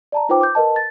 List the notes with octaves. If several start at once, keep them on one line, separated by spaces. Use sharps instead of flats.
D5 A5 A#5
D#4 F4 B4 C5 G5 D6
D6 G6
A#4 B4 D#5 A5
A6